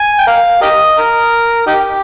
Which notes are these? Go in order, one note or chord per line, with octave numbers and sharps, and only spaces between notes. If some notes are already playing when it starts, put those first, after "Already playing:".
Already playing: G#5
G5
A#4 F5
G4 A#4 D#5
A#4
D#4 G4